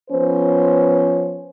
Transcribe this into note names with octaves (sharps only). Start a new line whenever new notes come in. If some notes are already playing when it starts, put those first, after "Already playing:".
F3 B3 C#4 C5